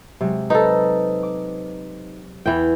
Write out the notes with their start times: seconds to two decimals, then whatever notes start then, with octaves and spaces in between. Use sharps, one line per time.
0.21 C3 F#3 G#3
0.50 D#4 A4 B4 C5 A#5
1.23 D6
2.46 E2 E3 E4 G5